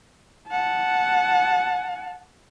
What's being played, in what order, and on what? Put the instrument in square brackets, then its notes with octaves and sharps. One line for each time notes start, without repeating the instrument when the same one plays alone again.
[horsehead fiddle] F#5 A5